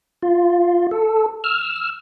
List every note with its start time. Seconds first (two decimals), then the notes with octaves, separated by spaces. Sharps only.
0.22 F4
0.91 A4
1.44 E6 F6